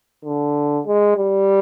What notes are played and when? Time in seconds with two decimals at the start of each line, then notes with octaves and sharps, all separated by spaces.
0.25 D3
0.86 G#3
1.17 G3